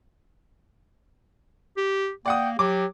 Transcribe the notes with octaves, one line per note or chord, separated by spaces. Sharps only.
G4
A#3 D5 F#5 G5 D#6
F#3 G4 D6